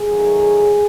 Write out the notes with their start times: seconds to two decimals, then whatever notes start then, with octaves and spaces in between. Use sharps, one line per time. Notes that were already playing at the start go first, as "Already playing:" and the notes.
Already playing: G#4
0.09 D#3 F#3 A3